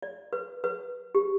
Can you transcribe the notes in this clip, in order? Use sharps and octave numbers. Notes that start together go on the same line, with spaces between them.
D5
B4
B4
G4